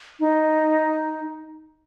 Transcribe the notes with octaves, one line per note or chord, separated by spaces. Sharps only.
D#4